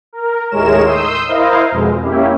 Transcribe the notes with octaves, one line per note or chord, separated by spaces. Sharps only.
A#4
D#2 A2 G#3 A#4 C#5 E7
C6 D#6 E6 G6
E4 A#4 C5 D#5 F5
F2 B2 G#3
A#3 C#4 E4 G4